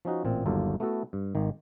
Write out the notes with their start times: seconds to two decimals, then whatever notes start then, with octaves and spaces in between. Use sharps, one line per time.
0.05 F3 C#4 D#4 F#4
0.24 A1 A#2 C4
0.46 G1 D#2 F#3 F4 A4
0.80 A3 B3 E4 F#4 A4
1.13 G2
1.35 G#1 D#3